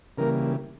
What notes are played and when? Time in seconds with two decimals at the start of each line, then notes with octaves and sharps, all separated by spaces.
0.18 C#3 E3 G3 A#3 A#4